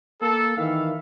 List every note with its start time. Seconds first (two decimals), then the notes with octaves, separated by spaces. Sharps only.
0.21 A#3 A4
0.57 D#3 E3 E5 F5